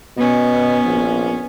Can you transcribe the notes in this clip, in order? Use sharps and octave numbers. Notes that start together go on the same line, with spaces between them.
B2 B3 C#4
A#1